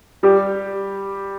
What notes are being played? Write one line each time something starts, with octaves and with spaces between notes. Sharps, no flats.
G3 G4